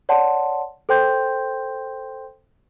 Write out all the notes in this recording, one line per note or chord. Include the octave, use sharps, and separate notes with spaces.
C#5 D5 F#5 A5 C6
A4 C5 G5 C6 G6